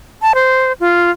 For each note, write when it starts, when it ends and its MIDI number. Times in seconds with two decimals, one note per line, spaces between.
0.22 0.33 81
0.35 0.73 72
0.80 1.10 65